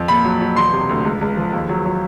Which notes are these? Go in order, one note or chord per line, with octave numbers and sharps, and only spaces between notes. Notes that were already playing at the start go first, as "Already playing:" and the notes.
Already playing: F2
A#2 B5
F#3
F#3
E1 C6
C3
D2
C#2
C#2
F3
D#2
F#3
F#3